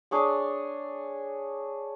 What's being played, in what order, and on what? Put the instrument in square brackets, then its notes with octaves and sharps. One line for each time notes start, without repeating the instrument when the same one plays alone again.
[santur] D4 G#4 C#5 D6